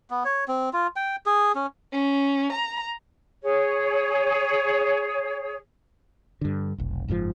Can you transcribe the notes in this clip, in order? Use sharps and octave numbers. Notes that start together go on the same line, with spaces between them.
B3
C#5
C4
F4
G5
G#4
C#4
C#4
A#5
G#4 C#5
G2 D3
F1 B1
F#1 G#2 C3 F3